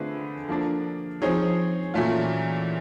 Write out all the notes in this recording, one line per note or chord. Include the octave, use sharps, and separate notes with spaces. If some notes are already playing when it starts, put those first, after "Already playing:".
Already playing: D3 A3 C4 F4 G#4 B4
F3 A#3 D4
F3 C4 D#4 G#4 C#5
A#2 E3 F#3 A3 C#4 F4